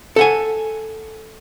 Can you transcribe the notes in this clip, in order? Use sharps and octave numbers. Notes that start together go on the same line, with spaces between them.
A4 F#5 G#5